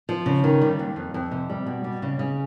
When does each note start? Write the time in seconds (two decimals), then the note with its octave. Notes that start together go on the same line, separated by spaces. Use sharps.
0.09 F3
0.26 C#3
0.44 D#3
0.61 G3
0.79 D#2
0.96 F2
1.14 F2
1.31 C3
1.50 G3
1.67 B2
1.84 G3
2.02 C#3
2.19 C#3